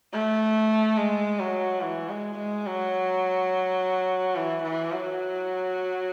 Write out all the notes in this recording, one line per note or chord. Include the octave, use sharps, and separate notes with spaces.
A3
G#3
F#3
E3
G#3
G#3
F#3
E3
E3
F#3